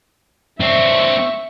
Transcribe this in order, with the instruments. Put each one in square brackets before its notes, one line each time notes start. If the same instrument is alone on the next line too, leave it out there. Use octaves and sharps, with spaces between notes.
[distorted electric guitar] C4 D4 [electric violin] E5 C#6